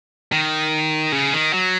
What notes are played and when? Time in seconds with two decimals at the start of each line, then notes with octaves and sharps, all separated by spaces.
0.32 D#3
1.12 C#3
1.33 D#3
1.53 F#3